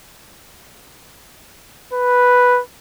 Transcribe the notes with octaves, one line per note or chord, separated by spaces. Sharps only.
B4